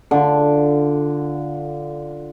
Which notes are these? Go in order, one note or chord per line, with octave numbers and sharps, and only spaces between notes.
D3 F4